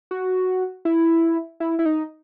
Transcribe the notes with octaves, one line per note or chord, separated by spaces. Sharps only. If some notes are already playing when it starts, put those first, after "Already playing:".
F#4
E4
E4
E4
D#4